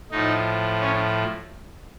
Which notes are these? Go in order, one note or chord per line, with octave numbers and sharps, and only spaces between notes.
A2 F3 D#4
C#4